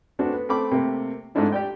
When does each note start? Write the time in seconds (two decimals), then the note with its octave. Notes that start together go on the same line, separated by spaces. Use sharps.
0.19 A3 B3 C4 D4 F#4 A4
0.33 B3
0.49 A3 C4 B5 D6
0.71 C3 A3 A#3
1.35 G#2 G#3 A3 C4 D4 E4
1.52 G4 D5 G5